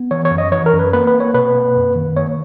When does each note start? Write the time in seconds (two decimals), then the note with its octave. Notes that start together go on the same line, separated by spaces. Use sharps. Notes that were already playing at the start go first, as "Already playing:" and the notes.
Already playing: B3
0.11 E3 C#5
0.25 C#5
0.31 F#2
0.38 D#5
0.52 E3 C#5
0.66 A#4
0.73 F#2
0.79 B4
0.93 A#3 B4
1.07 B4
1.14 A#3
1.20 C#5
1.34 B2 B4
1.55 A#3
1.76 F#2
1.96 D#3
2.16 A#3 C#5